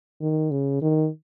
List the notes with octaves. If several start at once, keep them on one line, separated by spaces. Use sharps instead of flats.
D#3
C#3
D#3